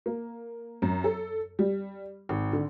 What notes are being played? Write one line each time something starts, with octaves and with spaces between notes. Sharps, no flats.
A#3
F#2
A4
G3
G#1
D3